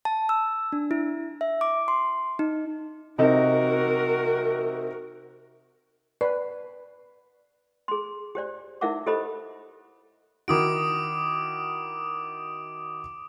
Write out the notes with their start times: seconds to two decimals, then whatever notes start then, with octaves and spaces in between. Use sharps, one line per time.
0.05 A5
0.29 E6
0.72 D4
0.91 E4
1.41 E5
1.61 D6
1.88 C6
2.39 D#4
3.18 C3 D#4 F#4 A#4
6.21 B4 D5
7.88 G#4 C6
8.35 G4 C5 D5
8.81 D#4 E4 A#4 E5 F#5 D6
9.06 G4 A4 C5 D#5 B5 D#6
10.48 D#3 E4 F#4 D6 D#6 D7